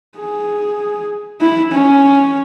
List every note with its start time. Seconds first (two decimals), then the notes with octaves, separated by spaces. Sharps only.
0.19 G#4
1.41 E4
1.72 C#4